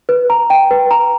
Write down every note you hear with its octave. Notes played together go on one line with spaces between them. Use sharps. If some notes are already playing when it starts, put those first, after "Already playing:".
B4
A#5
G5
B4
A#5